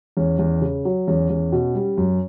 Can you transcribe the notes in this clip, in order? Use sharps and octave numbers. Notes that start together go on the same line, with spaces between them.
E2 C#4
E2
C#3
F#3
E2 C#4
E2
B2
G3
F#2